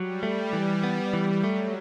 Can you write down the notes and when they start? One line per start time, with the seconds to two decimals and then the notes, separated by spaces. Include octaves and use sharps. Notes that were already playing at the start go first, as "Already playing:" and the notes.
Already playing: F#3 G3
0.23 A3
0.53 E3
0.83 B3
1.13 E3 G3
1.43 F#3 A3